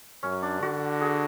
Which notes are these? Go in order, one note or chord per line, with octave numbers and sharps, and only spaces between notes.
F#2 C#4
D4
D3 F#4
G#4